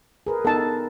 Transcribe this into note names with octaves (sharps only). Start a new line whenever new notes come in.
G#4 A#4 B4
B3 D#4 A4 A5